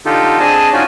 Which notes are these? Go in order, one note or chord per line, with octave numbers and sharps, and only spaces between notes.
D3 D#4 F4 G4 A4
C4 D4 G#4 D#5 G#5 A5
C#4 D#4 F4 F#4 D5 G#5